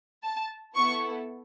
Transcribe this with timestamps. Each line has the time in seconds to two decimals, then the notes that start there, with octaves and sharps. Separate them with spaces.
0.24 A5
0.75 B3 E4 A4 C#6